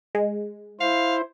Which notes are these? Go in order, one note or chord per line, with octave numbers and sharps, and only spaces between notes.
G#3
E4 C5 F5